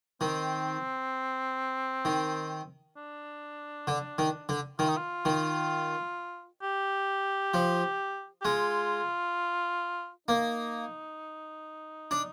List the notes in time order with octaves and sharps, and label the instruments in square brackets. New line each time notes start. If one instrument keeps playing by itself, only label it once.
[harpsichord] D#3 [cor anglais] C4
[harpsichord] D#3
[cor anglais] D4
[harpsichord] D3
D#3
D3
[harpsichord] D#3 [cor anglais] F4
[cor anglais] D#4
F4
[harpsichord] D#3
[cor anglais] G4
[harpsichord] F3
[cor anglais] G4
[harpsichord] G#3 [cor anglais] F4
[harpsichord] A#3 [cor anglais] D#4
[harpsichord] D4